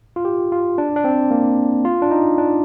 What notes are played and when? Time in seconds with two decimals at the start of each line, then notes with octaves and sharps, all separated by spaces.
0.16 F4
0.25 G4
0.52 F4
0.78 D4
0.96 D4
1.04 C4
1.31 A#3
1.85 F4
2.02 D4
2.11 D#4
2.38 D4